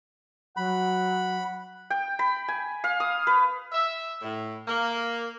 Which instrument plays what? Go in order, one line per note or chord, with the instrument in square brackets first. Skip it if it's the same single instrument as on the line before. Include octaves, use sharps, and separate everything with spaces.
[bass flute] F#3 [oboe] F#5 [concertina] B5
[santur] G5
B5
G#5
F5
D#6
B4
[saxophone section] E5
A2
A#3